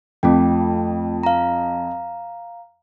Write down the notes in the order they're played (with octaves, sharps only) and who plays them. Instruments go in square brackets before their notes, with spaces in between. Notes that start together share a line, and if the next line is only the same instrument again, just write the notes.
[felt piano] F2 [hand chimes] A3 F4 G5
[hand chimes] F5 A#5